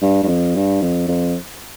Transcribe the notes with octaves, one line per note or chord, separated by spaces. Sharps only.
G2
G2
F2
G2
F2
F2